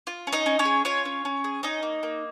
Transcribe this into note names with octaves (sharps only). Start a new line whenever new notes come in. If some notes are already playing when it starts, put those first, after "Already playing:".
F4
C#4
D#4 D#5
C#4
C#4 C#5
G#4
C#4 F4 C#5
C#4
C#4
G#4
C#4 D#4 D#5
A#3
A#3